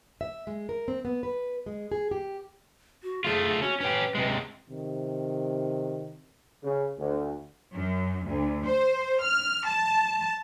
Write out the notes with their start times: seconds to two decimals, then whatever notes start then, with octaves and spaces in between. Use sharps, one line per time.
0.21 E5
0.47 G#3
0.69 A#4
0.88 C4
1.05 B3
1.23 B4
1.66 G#3
1.92 G#4
2.11 G4
3.03 F#4
3.25 A3 F4 G#4
3.62 C#4 F#4
3.80 C#4 G4 B4
4.15 C3 G#3
4.70 C3 D#3
6.64 C#3
6.99 D2
7.75 F#2
8.27 D2
8.66 C5
9.23 F6
9.66 A5